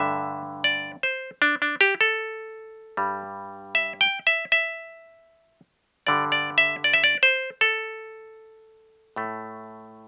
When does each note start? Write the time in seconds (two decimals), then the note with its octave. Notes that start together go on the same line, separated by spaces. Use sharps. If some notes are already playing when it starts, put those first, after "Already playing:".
Already playing: G2 D3 A3 E5
0.64 D5
1.03 C5
1.42 D4
1.62 D4
1.81 G4
2.01 A4
2.97 G2 G3
3.75 E5
4.01 G5
4.27 E5
4.52 E5
6.07 G2 D3 G3 D5
6.32 D5
6.58 E5
6.84 D5
6.93 E5
7.04 D5
7.23 C5
7.61 A4
9.16 A2 A3